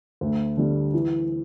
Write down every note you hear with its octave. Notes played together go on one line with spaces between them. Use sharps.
D2
D3 G3
E3